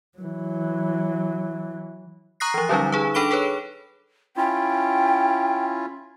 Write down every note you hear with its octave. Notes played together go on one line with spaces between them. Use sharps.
E3 F#3
A#5 C#6 D#6 F#6 A#6 C7
E3 F3
D3 F#3 G3 C#4 D#4
D#4 G#4 B4
D4 A4 B5 D7 G7
G#4 A4 B4 C#5
C#4 E4 F4 G5